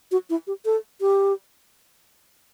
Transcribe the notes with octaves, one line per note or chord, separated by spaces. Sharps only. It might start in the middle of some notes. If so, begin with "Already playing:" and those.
F#4
E4
G4
A4
G4